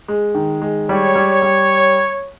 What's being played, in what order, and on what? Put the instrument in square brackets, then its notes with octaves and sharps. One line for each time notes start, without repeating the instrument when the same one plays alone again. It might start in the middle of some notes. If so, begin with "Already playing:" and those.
[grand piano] G#3
D#3
G#3
[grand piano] G3 [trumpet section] C#5
[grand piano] G3
G3